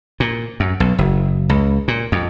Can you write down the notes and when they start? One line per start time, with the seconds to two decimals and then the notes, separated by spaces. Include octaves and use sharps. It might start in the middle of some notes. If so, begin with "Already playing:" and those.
0.20 A#2
0.60 F#2
0.80 B1
0.98 F#1
1.49 C#2
1.88 A#2
2.12 F2